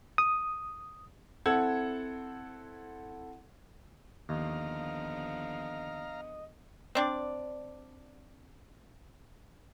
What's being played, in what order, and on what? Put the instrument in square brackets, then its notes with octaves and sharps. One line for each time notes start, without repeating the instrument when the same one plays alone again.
[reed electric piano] D#6
[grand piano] C4 E4 A4 F#5 E6 G#6
[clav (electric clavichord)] D#2 [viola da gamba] D3 F3 B3 [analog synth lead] D#5 [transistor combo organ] F5 A#5
[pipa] C4 D4 D5